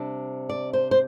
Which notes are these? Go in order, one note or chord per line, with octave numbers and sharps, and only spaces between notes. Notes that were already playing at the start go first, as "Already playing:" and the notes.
Already playing: C3 G3 D4
D5
C5
C5